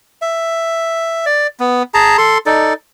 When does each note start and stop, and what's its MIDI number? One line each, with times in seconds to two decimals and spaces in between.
0.22 1.25 76
1.26 1.47 74
1.60 1.83 59
1.94 2.17 68
1.94 2.17 81
1.94 2.17 82
2.18 2.38 69
2.18 2.38 84
2.46 2.73 63
2.46 2.73 69
2.46 2.73 74